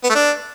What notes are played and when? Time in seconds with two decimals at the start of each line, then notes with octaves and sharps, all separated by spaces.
0.04 B3
0.10 A3
0.15 D4